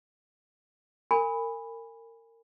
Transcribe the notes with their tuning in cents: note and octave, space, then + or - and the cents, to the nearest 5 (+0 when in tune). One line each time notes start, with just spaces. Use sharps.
A#4 -30 G#5 -20 B5 +0